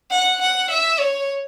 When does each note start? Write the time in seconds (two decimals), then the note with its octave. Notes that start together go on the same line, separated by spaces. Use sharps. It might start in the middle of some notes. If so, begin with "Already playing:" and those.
0.11 F#5
0.41 F#5
0.70 E5
0.99 C#5